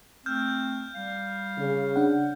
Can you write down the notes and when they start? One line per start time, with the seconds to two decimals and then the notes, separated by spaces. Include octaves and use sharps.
0.26 A3 C4 F6 G6
0.95 G3 F5
1.58 C#3
1.96 D4 F#5